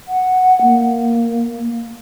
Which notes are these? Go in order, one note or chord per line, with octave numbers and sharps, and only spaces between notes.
F#5
A#3